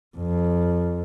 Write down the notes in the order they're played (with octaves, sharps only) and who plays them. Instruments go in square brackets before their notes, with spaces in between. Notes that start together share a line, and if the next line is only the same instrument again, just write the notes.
[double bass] F2